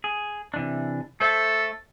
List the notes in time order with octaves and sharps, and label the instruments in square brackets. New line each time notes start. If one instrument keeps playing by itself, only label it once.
[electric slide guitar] G#4
C3 E3 D4
[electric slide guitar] A3 C5 E5 [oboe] A4